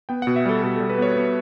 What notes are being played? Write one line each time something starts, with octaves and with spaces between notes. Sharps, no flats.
B3 G5
B2 F#5
E5
G3 A4
B2 A4
G3 A4
B4
B3 C#5
B3